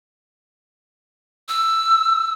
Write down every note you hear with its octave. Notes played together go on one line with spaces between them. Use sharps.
E6